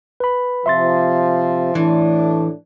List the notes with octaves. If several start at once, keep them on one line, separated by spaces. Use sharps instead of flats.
B4 B5
C3 F3 E5 C6 A6
A2 E3 A3 D4